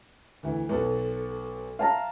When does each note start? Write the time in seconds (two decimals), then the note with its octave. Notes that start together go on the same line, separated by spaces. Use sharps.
0.43 D2 E3
0.69 B1 B3 A4
1.79 F5 A5 A#5